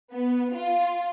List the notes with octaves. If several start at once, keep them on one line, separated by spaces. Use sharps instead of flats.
B3
F4